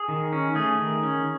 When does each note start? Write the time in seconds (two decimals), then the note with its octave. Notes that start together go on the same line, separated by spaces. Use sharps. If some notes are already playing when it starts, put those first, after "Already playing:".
Already playing: G#4
0.08 D#3
0.32 C#4
0.55 A3 G#4
0.79 D#3
1.03 C#4